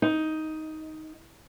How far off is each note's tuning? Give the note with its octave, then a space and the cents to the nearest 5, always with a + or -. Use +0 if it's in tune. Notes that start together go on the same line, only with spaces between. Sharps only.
D#4 +10